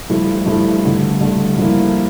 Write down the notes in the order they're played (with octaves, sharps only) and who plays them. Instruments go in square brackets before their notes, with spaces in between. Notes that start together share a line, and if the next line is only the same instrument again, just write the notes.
[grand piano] G2 F3 A3 E4
G2 F3 A3 E4
G2 D3 A3
G2 D3 A3
G2 F3 A#3 E4